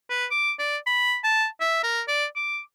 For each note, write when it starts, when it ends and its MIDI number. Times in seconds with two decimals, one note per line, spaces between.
0.10 0.26 71
0.31 0.52 86
0.59 0.77 74
0.86 1.18 83
1.24 1.46 81
1.60 1.80 76
1.84 2.02 70
2.08 2.26 74
2.36 2.60 86